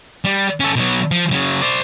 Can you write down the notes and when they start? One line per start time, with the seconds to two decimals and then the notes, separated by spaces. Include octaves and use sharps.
0.25 G3
0.60 C#4 A4
0.76 B2 F#3
1.11 F3
1.31 C#3 F#3
1.62 C5 D5